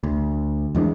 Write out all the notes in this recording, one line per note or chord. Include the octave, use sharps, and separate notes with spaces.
D2
E2 E3 G#3 D4